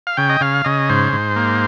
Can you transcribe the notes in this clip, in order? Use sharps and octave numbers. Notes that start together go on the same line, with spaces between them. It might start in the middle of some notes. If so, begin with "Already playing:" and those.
F5
C#3 G5
D#5
C#3 F5
C#3 D#5
G#2 C5
G#2
A#3